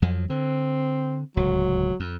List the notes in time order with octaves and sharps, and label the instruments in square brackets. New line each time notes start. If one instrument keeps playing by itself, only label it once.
[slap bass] F2 F3 F#3
[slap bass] D3 [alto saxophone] C4
[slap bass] D1 C#2 [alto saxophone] F#3
[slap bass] F2